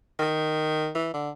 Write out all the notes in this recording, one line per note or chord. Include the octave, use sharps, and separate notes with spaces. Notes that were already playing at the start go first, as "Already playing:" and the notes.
D#3
E3
D3